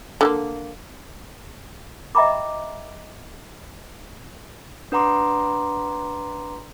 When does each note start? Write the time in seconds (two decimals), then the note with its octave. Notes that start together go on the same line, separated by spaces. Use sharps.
0.21 D3 G3 A#3
2.15 D#5 E5 G5 A#5 B5 D6
4.92 D4 B4 F#5 A#5 C6 D6